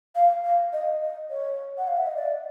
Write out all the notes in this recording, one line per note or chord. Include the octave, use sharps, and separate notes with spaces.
F5
F5
D#5
D#5
C#5
F#5
F5
E5
D#5
D5